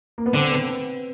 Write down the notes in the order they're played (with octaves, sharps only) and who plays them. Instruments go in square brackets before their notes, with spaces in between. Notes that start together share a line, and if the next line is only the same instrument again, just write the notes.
[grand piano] A#3
B3
[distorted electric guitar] D3 [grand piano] C4
[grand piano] B3